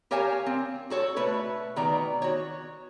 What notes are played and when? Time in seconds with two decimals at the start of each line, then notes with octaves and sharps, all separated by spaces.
0.11 G4 A#4 C#5 F5 G#5 A5
0.46 C4
0.90 F#4 A4 C#5
1.16 B2 A3 B4 C#5
1.76 B2 D#3 B3 D5 A#5
2.22 F#4 C#5